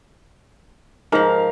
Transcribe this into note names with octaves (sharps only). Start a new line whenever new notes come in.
G#2 F3 A#4 F5